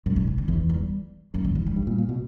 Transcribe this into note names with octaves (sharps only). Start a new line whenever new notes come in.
F#2 A#2
B2
C#3
D3
E2 E3
G3
F#2 A#3
D3
E3
G3
G2
A#2
A#2
B2